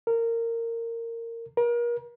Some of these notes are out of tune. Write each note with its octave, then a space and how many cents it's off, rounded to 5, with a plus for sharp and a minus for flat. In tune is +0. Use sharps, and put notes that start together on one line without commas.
A#4 -20
A#4 +35